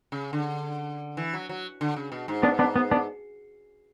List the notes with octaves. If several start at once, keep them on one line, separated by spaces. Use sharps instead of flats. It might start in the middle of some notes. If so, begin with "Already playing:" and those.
C#3
D3
E3
F#3
F#3
D3
C#3
B2
G#2
B3 D4
B3 D4
B3
B3 D4